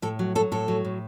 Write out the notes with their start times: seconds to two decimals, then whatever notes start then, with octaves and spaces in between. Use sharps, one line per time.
0.02 A2 A4
0.19 F#3
0.35 F#3 A4
0.52 A2 A4
0.68 F#3
0.85 A2